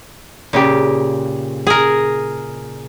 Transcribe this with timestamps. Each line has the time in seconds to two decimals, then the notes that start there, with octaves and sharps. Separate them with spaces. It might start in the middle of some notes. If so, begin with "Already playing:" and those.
0.53 A#2 C#3 G4
1.67 G#4 A#4